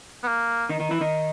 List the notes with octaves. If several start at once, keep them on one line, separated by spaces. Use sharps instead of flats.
B3
A#3
D#3 D#4
D#3 D#4
E3 E4
D#3 D#4